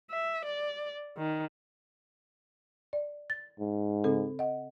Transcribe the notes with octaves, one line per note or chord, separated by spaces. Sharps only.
E5
D5
D#3
D5
A6
G#2
C#3 C4 A4
D#5 F#5